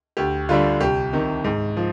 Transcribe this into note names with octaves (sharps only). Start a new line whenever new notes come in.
D2 G4
D3 G3 D4 F4
C2 G4
C3 D#3
G#2
F3